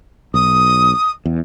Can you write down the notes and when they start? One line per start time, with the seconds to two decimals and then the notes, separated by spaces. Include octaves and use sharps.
0.34 B1 D#6
1.25 E2